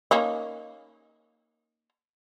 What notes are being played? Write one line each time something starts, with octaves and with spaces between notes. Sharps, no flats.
A#3 C#4 D#4